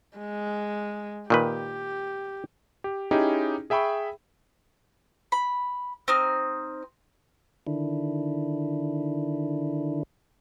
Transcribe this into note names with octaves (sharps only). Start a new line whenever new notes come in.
G#3
A#2 D#3 G4 B4
G4
C#4 D#4 E4 G4 G#4
G#4 E5 G5 B5 C#6
B5
C4 D#4 F6
D3 D#3 D4 E4